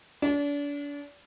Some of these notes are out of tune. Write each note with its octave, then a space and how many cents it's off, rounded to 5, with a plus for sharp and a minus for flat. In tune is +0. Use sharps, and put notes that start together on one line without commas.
D4 -35